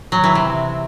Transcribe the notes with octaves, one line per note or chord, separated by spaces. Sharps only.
F#3
E3
C3